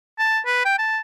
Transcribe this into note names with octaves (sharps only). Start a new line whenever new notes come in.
A5
B4
G5
A5